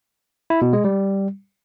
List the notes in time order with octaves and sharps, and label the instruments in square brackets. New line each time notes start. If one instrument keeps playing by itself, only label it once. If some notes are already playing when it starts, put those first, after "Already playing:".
[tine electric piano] E4
B2
G#3
G3